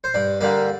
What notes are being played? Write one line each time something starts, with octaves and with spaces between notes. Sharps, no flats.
C5
G2 D5
D3 G3 A#3 D5